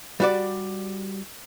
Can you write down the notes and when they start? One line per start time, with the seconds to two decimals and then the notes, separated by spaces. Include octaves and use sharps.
0.20 G3 F#4 D5